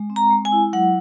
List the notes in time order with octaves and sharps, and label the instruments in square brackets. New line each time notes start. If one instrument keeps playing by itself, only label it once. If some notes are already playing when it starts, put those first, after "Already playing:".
Already playing: [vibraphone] G#3
C4
A#5
G#3
G#5
E4
F#3 F#5